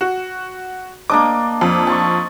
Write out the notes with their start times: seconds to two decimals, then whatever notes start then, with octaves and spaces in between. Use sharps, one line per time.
0.01 F#4
1.10 A#3 D4 D#5 D6
1.61 F2
1.87 A5 C6 C#6